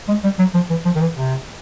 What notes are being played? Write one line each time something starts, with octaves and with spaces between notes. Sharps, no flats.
G#3
G3
F#3
F3
E3
F3
D#3
E3
C3